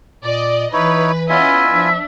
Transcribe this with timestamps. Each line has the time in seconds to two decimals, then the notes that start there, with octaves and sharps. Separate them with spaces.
0.23 A#2 D5 D#5
0.73 E3 D#4 E4 B4 C#5
1.29 B3 C#4 E4 F4 D#5 E5 G#5
1.70 F3 D4